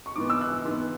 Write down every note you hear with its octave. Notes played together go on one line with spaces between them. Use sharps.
C#6
G#2 E3 B3 D6
E6
F#6
G#2 E3 B3